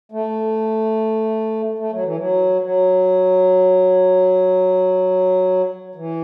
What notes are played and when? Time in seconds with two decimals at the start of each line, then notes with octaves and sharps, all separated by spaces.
0.12 A3
1.79 A3
1.91 F#3
2.04 E3
2.17 F#3
2.62 F#3
5.95 E3